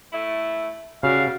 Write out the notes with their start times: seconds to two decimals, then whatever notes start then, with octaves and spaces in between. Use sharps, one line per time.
0.13 A3 E4
1.03 C#3 G3 F#4 F5